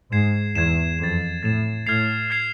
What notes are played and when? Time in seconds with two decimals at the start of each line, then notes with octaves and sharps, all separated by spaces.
0.12 G#2 G#6 C7 E7
0.55 E2 G#6 C7 E7
0.99 F2 A6 E7
1.43 A2 A6 E7
1.86 A2 F6 G#6 C7 F7
2.30 F6 G#6 C7 F7